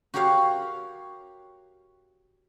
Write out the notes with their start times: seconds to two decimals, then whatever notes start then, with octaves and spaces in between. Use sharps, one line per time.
0.14 F#4 G4 A#4 C#5 F5 F#5